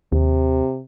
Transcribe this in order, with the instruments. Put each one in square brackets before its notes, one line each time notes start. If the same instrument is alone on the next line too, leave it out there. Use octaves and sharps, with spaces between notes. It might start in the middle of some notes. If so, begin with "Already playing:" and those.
[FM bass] D#2 [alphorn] C3